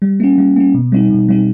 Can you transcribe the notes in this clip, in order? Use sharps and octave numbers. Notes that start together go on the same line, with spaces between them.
G3
A#3 C#4
G3
A#3 C#4
B2
G3 C4 D#4
B2
G3 C4 D#4